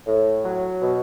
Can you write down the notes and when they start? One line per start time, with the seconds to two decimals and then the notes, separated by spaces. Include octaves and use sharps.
0.06 A2
0.44 F#3
0.82 B2